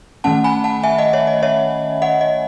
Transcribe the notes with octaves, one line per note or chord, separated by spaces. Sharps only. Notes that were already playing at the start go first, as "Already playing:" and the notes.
D#3 A3 C#4 F#5 A5
G#5 B5
F#5 A5
E5 G#5
D#5 F#5
C#5 E5
D#5
C#5 E5
D#5 F#5
D#5